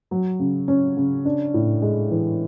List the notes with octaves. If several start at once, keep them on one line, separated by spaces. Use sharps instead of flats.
F#3
C#3
C#4
C#3
D4
A2
G#3
E3